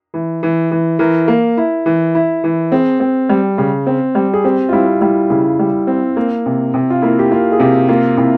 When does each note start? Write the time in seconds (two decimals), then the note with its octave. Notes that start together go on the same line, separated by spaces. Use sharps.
0.14 E3
0.43 E3
0.71 E3
0.99 E3 A#4
1.28 A#3
1.57 E4
1.86 E3
2.15 E4
2.44 E3
2.72 C4 G#4
3.00 C4
3.29 G3
3.58 C#3
3.87 C4
4.15 G3
4.34 G#4
4.44 C4 G4
4.69 F4
4.72 G3 E4
5.01 G3 E4
5.30 C#3 E4
5.59 G3
5.87 C4
6.17 A#3
6.46 C3
6.74 C3
6.90 F4
7.02 A#3 E4
7.19 G4
7.31 A#3 F4
7.52 G#4
7.60 C3 G4
7.89 A#3 F4
8.17 C3 E4